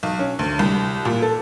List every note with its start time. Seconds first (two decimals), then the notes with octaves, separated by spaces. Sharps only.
0.03 B1
0.19 C#4
0.39 D2
0.59 C2
1.05 A#2
1.22 A4